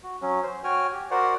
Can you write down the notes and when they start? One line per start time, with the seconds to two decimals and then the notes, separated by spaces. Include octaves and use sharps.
0.03 F#4
0.22 F#3 C#4
0.43 C5
0.64 F#4 C#5 G5 G#5 F6
0.92 G4
1.11 F#4 A#4 C5 D5 F#5